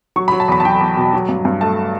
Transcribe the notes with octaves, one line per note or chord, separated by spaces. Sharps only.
F#3 C#6
B5
F#3
A5
E2 B5
A5
F#3 G5
E2
B2
F#3
G2
G2
A3 A5